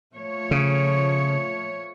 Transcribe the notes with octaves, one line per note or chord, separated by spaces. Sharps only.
F3 A3 C#5
C#3